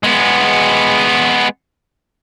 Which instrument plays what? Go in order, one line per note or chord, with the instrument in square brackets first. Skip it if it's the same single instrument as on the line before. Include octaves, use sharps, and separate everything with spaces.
[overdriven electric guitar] G#3 B3